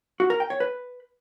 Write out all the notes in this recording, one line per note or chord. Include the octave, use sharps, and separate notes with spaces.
F#4
A#4
G5
C#5
B4